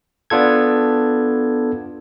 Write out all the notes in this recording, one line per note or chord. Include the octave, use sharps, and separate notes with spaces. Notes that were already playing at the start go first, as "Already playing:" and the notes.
B3 D4 F4 A4 G#6